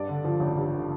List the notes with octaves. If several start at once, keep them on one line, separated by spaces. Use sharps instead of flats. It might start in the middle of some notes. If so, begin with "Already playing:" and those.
Already playing: G2 D5
D3
F3
A1
G2
D3